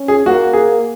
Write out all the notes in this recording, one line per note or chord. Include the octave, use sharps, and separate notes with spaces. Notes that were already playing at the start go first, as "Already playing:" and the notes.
Already playing: C#4
G#4
A#3 F#4
G#4